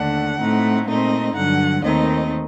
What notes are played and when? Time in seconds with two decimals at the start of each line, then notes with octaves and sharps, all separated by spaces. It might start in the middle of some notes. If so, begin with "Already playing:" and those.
Already playing: D#2 D3 A3 D4 F#5
0.39 A2 A3 C4 D#4
0.87 A#2 A3 C4 D#4 D#5
1.35 G2 D3 F#3 F#5
1.83 D#2 D#3 A3 C4 D#4 D#5